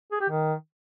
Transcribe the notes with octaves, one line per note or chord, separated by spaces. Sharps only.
G#4
G4
D#3